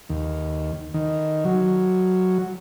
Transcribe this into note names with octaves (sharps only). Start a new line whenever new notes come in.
D#2
D#3
F#3